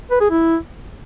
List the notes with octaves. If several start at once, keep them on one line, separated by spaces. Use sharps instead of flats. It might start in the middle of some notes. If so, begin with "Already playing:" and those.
B4
G#4
E4